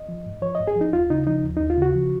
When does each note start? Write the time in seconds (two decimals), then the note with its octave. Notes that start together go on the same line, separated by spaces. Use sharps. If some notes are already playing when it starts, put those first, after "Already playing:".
Already playing: D#5
0.09 F3
0.26 G#2
0.42 F3 C#5
0.55 G#2 D#5
0.67 G#4
0.76 F3
0.81 D#4
0.93 D#2 F4
1.10 C#3 D#4
1.27 F3 D#4
1.43 D#2
1.57 D#2 D#4
1.70 F4
1.77 C#3 F#4
1.95 F3